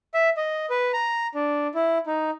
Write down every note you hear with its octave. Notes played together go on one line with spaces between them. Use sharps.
E5
D#5
B4
A#5
D4
E4
D#4